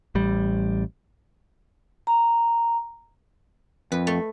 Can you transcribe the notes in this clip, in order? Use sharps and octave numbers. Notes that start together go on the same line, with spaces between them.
A1 G3
A#5
F2 B4
A3